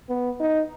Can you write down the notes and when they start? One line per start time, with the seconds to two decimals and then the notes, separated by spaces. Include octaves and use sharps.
0.09 B3
0.40 D#4